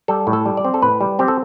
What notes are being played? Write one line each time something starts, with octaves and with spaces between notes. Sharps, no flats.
G3 A4
A2
A4
G3
D5
C4
A4
A2 B4
G3
C4 G4
A4